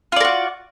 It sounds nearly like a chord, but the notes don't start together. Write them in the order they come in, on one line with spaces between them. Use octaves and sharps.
F4 D5 A#4 F#4